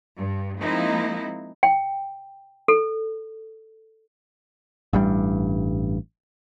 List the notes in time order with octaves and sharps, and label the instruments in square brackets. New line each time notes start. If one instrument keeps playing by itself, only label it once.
[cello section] G2
F3 G#3 A#3 C4 D#4 E4
[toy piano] G5
A4
[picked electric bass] A1 G2 G3